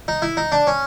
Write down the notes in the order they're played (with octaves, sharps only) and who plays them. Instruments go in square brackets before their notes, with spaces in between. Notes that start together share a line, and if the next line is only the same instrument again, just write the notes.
[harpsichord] D#4
E4
D#4
D4
C#4